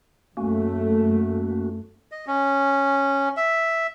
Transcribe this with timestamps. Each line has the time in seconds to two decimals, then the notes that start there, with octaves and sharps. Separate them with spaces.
0.37 F#2 A3 A#3 C#4 F#4
2.11 D#5
2.27 C#4
3.37 E5